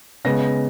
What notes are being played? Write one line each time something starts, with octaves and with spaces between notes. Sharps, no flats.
C#3 G#3 B3 A#6